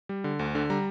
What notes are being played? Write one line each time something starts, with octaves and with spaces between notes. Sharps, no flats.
G3
D3
D2
D3
G3 A#5